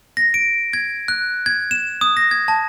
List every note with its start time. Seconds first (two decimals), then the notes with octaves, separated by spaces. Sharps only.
0.17 A#6
0.34 D7
0.73 G#6
1.08 F#6
1.46 G#6
1.71 E7
2.01 D#6
2.17 A#6
2.31 G#6
2.48 A5